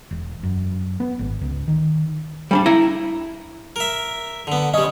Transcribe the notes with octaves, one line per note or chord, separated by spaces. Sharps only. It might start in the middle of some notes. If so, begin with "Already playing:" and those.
E1
F#2
B3
G#1
C#2
D#3
G3 C#4 D4
E4 A#5
A#4 E5
D3 B3
G3 C#4 D#5